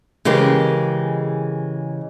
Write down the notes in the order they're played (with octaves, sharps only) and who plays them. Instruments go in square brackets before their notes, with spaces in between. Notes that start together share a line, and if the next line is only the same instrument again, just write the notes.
[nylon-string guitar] C#3 E3 G#3 G4 A#4